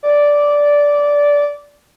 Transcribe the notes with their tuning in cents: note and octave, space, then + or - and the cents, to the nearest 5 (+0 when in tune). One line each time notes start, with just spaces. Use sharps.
D5 -10